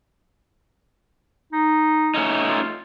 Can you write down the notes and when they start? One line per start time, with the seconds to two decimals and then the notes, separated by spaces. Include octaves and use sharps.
1.53 D#4
2.14 A3 C#4 D#4
2.48 F4